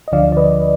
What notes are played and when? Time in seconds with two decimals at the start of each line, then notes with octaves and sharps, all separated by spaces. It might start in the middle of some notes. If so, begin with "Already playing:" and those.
0.08 D#5
0.12 D2 D3 F3 D5 F5
0.32 D5
0.37 B4 D#5